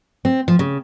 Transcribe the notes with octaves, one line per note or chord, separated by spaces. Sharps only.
C4
F3
C#3